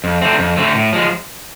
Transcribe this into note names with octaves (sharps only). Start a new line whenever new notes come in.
F2
D3 A3 C4
F2
D3 A3 C4
A2
F3 G#3